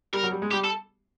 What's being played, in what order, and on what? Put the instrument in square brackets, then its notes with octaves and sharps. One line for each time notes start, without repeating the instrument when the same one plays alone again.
[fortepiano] G3 [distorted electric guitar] A#4
[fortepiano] F#3
G3
G#3
[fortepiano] G3 [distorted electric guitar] G4
[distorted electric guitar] A4